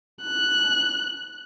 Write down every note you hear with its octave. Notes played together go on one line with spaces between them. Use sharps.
F#6